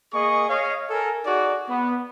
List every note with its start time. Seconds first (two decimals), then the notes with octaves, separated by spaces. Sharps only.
0.13 A#3 G#4 D#5 C#6
0.49 C#5 D#5 F5
0.90 A4 A#4 G#5
1.25 D#4 F#4 G#4 D5
1.69 B3